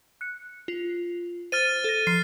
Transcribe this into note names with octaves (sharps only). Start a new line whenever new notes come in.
F#6 C#7
F4
C5 F6 A6 D#7
A4 A#6
F3 C7